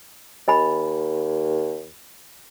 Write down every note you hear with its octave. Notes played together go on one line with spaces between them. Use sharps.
D#2 D#5 G#5 B5